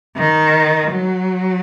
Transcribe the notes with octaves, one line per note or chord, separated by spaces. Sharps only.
D#3
F#3